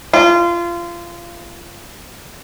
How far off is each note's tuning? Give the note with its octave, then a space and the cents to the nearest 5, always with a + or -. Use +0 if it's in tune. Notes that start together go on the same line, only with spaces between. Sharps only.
F4 -25